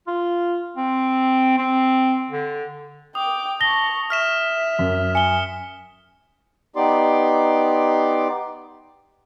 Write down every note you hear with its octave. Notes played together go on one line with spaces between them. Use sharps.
F4
C4
C4
D3
G5 D6 D#6
A5 C#6 A#6 G7
E5 F6 B6 E7
F#2
G#5 C#7 G7
B3 D#4 G4 D5 C6 D6